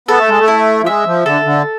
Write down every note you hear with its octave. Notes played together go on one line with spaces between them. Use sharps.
B3 A4
A3
G#3
A3
E4
F3
G#3 E5
F3
D3 A4
D3